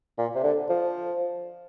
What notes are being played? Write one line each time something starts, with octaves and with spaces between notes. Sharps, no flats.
A#2
C3
D3
F3